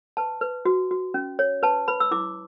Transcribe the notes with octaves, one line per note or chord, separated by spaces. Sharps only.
B4 A5
B4
F#4
F#4
C#4
C#5
B4 A5
B4 B5
E6
E4 D6